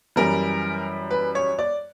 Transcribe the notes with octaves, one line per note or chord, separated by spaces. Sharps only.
F#2 E3 G3 A#4
B4
C#5
D5